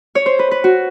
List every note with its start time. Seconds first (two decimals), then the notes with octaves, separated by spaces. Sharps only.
0.15 C#5
0.26 C5
0.39 B4
0.51 B4
0.64 F#4